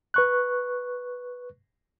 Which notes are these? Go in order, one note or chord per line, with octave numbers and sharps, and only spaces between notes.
B4 C#6 F#6